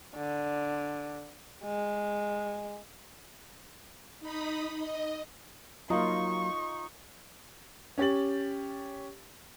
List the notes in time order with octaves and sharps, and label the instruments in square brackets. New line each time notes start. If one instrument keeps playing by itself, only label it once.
[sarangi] D3
G#3
[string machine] D#4 B5 D#6
D#5
[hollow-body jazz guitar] F#3 A#3 [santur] D#4 [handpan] F4 [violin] C#6
[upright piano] C#4 G4 A6 F#7